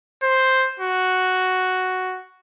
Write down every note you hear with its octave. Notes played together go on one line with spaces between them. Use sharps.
C5
F#4